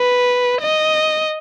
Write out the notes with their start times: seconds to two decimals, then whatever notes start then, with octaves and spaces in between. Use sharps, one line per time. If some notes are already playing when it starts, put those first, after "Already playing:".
Already playing: B4
0.61 D#5